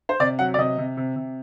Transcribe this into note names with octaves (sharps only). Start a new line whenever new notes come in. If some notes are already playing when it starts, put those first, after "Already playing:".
C5
C3 D5
F#3 F#5
D5
C3 D#5
C3
C3
C3